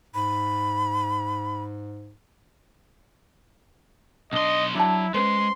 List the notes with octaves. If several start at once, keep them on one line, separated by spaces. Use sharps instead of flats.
G#2 B5
B1 D4 D#5 C6
F#3 D4 E4 F#4 A5
G#3 C#4 B4 C5 C6